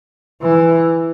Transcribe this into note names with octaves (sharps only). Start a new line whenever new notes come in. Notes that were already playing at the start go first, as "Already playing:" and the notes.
E3